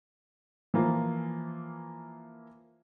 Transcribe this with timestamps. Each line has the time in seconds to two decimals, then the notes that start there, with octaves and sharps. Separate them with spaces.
0.74 E3 F3 A#3 F4